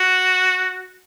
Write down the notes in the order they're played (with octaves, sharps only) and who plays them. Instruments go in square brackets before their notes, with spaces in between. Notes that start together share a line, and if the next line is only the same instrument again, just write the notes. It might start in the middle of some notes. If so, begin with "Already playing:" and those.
Already playing: [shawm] F#4